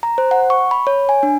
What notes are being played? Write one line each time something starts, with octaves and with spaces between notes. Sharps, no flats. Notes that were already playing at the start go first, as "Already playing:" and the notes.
A#5
C5
F#5
C#6
B5
C#5
G#5
D4